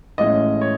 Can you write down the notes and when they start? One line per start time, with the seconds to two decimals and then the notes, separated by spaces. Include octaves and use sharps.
0.18 A1 A2 G#3 C#4 D#5
0.61 C#5